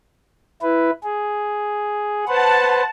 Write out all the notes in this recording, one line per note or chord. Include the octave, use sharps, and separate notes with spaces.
E4 B4
G#4
B4 C5 F#5 A5